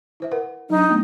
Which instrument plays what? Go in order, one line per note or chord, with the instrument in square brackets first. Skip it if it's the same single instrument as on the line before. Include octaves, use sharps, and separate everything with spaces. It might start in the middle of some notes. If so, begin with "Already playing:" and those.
[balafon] E4 C5 E5
A#4 B4 F#5
[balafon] F#3 D4 [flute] D#4
[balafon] A3 B3 F4